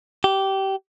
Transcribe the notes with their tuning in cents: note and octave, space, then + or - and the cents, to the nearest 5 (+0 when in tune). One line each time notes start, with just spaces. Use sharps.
G4 -20